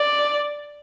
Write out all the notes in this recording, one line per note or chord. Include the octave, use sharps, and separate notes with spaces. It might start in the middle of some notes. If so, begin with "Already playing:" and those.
Already playing: D5